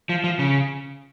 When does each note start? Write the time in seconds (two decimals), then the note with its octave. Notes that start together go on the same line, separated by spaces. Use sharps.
0.09 F3
0.24 F3
0.39 C#3